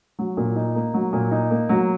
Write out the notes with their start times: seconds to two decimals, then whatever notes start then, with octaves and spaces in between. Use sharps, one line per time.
0.19 F#3
0.37 A#2
0.56 D#4
0.75 A#3
0.94 F#3
1.13 A#2
1.31 D#4
1.51 A#3
1.69 F#3